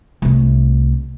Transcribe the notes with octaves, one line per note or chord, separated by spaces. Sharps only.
C2 A3